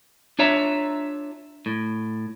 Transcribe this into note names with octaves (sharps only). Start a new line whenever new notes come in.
D4 F4 C#5 E5 A#5
A2